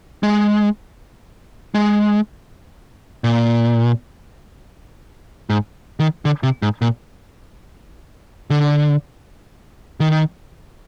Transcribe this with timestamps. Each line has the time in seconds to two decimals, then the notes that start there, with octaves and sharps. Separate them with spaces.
0.23 G#3
1.74 G#3
3.24 A#2
5.50 G#2
6.00 D#3
6.25 D3
6.43 C3
6.62 G#2
6.82 A#2
8.50 D3
10.00 D#3